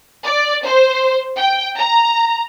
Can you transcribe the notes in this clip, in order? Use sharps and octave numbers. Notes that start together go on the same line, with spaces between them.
D5
C5
G5
A#5